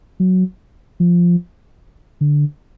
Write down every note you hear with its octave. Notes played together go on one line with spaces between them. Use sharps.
F#3
F3
D3